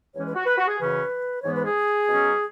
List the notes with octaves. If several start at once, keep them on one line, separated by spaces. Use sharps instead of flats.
E2 E3 G#3 C#4 C#5
B4
F#4
B4
F#4
G#4
F#2 C#3 E3 C#4 B4
G#2 E3 G#3 B3 C#5
B4
G#4
B2 F#3 C#4